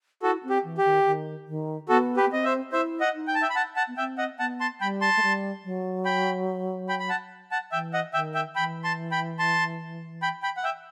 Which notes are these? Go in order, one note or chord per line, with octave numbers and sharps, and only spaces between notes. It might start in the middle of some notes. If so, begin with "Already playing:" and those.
E4 F#4 A4
C4
G4
E3
G4
D#3
D#3
D#3
B3 F#4 A4
G4 B4
B3
C4 D#5
C5 E5
E4 C5 E5
D#5 F#5
D#4
G5
A5
E5 G5
B5
F#5 A5
F#5 A5
B3
C4 E5 G5
D#5 F#5
B3 F#5 A5
A5 C6
G3 G5 B5
A5 C6
A3
G3
F#3
G5 B5
G5 B5
B5
F#5 A5
F#5 A5
E3 E5 G5
D#5 F#5
D#3 E5 G5
E5 G5
E3 G5 B5
A5 C6
G5 B5
A5 C6
G5 B5
G5 B5
F#5
E5 G5